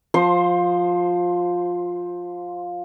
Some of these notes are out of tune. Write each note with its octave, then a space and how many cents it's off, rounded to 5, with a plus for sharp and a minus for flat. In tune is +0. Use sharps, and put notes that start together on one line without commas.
F3 +15 C5 +0 C6 +20